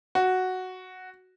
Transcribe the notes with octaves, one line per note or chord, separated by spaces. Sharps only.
F#4